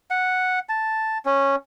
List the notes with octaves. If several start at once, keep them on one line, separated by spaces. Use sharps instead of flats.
F#5
A5
C#4